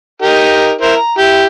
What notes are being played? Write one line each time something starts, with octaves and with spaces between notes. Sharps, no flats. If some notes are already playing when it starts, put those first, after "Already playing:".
D#4 G4 A#4
E4 A#4 C5
A#5
E4 G4